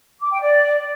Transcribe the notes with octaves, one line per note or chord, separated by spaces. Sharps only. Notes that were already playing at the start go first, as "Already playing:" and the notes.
D6
G5
D5